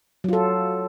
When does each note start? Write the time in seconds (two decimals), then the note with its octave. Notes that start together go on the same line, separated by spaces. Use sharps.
0.24 F#3
0.29 F4
0.33 A4